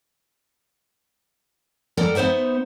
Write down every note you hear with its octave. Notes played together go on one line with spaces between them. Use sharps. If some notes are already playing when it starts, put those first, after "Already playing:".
G2 A4 A#4 D5 F#5 A#5
B3 D#4 C5 E5 F#5